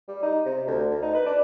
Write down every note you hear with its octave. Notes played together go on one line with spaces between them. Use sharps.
G3
D#4
C3
D2
D2
D#4
B4
D4